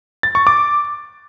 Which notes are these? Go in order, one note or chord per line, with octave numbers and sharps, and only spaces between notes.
A6
C#6
D6